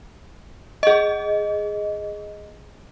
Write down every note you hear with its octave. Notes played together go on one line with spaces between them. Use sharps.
G#4 D#5